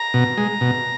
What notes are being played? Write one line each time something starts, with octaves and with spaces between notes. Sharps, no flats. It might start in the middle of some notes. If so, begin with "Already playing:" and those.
Already playing: A#5
B2
G#3
B2